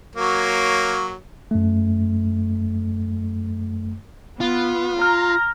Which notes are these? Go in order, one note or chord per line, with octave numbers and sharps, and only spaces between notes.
F#3 A#3 C#5
F#2 A3
B3 F4
A#5 F6